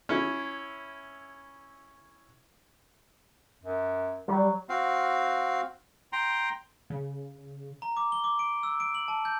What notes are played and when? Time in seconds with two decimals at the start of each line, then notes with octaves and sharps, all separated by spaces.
0.09 C#4 E4
3.63 F#2
4.28 F#3 G3
4.69 C4 F#4 F5
6.13 G5 A#5 C6
6.90 C#3
7.82 A#5
7.97 D6
8.12 G7
8.24 D6
8.39 D7
8.63 E6
8.80 D7
8.95 F#7
9.08 A5
9.25 G6